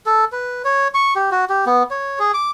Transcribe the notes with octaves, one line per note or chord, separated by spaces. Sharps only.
A4
B4
C#5
C#6
G4
F#4
G4
B3
C#5
G#4
D6